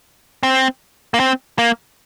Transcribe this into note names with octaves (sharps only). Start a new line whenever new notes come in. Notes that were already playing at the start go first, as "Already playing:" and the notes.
C4
A#3
C4
A#3